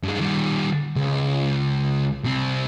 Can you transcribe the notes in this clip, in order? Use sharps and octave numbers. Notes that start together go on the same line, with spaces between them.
G2 G#3
D#3 G3
C#2
C2 C4